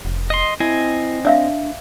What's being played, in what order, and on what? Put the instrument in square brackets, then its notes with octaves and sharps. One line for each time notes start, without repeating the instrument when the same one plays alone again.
[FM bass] F1
[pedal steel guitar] D#5 C6
[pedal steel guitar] C4 D#5 G#5 [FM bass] E4
[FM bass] D4 [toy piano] D5 E5 F5